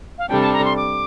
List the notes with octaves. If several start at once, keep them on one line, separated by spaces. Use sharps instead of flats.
F5
C3 G3 D4 A4 G5
A5
A#5
C6
D6